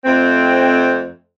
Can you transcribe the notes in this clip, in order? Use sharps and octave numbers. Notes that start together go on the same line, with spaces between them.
F2 A3 C4